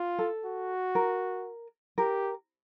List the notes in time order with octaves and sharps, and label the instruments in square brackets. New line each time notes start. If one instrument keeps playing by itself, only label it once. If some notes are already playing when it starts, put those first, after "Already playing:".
Already playing: [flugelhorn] F4
[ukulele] A4
[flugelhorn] F#4
[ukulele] A#4
[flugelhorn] G4 [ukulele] A#4